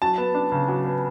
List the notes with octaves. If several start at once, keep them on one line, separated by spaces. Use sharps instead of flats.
F#3 A5
B3
D4
C#3
F#3
B3